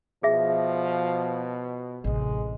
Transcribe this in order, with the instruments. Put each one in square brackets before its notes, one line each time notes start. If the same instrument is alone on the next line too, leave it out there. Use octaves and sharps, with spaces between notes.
[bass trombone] B2 [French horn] F3 [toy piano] G#4 E5
[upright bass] A1 C3 [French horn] G#3